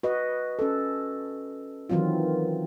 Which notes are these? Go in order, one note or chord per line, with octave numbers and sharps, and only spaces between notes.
F#4 B4 D#5
C#4 A4
D#3 E3 F#3 C4 F4